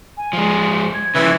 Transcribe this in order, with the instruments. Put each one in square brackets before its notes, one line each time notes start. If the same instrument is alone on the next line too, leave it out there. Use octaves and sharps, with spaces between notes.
[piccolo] G#5
[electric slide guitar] F3 G#3
[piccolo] G#6
[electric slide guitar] C#3 F3 [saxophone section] E3